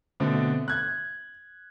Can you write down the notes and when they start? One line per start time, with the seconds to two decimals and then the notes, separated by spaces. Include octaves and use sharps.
0.20 B2 D3 A3 C4
0.68 F#6 G#6